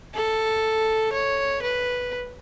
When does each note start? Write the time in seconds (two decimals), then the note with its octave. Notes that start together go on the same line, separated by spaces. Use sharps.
0.14 A4
1.13 C#5
1.62 B4